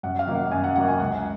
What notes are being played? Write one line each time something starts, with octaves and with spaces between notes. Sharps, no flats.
F#2 F#5
F5
D#3 F#3 A#3
F#5
F#2 G#5
F#5
D#3 F#3 A#3 F#5
G#5
C#2 F#5